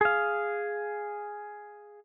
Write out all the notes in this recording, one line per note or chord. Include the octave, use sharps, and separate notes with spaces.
G#4 F5